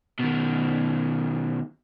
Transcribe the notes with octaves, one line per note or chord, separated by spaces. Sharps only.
B2 D#3